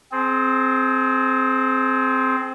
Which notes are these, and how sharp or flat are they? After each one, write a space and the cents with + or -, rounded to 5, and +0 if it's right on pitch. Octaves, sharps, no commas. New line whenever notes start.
C4 +0 G#4 +35